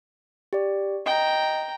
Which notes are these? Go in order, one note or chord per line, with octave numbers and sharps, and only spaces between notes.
G4 D5
D#5 G5 A#5